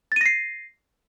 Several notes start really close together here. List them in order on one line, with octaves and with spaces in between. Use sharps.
A6 D#7 A#6 C7